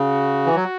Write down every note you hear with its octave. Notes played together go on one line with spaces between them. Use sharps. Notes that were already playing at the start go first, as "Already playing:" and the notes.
Already playing: C#3 F#4
E3
F#3